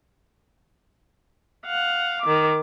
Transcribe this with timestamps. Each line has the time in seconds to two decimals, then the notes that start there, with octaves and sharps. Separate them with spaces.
1.66 F5 F#5
2.22 D#3 D6